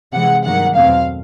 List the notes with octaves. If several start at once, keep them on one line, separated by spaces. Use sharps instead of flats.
C3 E3 G#3 F#5
G2 D#3 F#3 A#3 F#5
E2 B2 F#3 A3 C4 F5